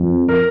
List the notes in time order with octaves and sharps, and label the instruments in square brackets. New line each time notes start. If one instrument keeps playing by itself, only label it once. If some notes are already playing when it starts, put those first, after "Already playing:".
Already playing: [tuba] F2
[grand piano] A#4